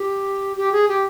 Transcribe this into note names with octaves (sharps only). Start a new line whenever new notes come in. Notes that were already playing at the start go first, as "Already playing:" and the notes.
Already playing: G4
G4
G#4
G4